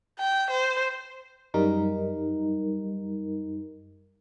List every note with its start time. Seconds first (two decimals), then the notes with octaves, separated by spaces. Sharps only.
0.19 G5
0.50 C5
1.54 F#2 G3 D#4 A#4